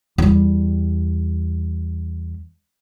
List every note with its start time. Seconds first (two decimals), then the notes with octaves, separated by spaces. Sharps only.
0.18 E2 G3